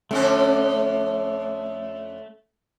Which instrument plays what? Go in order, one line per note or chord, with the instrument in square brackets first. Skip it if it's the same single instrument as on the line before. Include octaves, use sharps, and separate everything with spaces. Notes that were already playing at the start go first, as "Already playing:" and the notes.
[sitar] F2 D3 C#4 [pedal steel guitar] A3